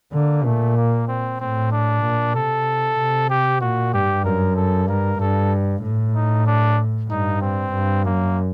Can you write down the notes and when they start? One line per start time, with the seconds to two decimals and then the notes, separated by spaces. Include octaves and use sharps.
0.13 D3 A#3
0.45 A#2 A3
0.77 A#3
1.08 C4
1.39 A2 C4
1.71 D4
2.03 A#2
2.35 C3 A4
2.98 C3
3.30 G4
3.61 A#2 F#4
3.93 G2 G4
4.25 F#2 A#4
4.56 A4
4.88 G2 A#4
5.20 G2 A4
5.83 A2
6.15 D#4
6.46 D4
7.10 G2 D#4
7.41 C4
7.73 G2
8.05 F#2 A#3